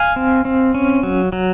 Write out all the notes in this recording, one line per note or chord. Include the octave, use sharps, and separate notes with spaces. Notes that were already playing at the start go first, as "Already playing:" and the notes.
Already playing: F5 G#5
C4
C4
C#4
F#3
F#3